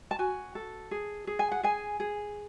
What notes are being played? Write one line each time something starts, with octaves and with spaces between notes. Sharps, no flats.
A5
F#4 G#5
A4
G#4
G#4
G#5
F#5
G#4 G#5
G#4